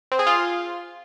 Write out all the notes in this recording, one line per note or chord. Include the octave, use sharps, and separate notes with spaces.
C4
G#4
F4